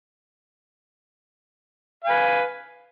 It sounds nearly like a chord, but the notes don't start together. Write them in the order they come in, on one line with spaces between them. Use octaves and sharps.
F5 G#5 B4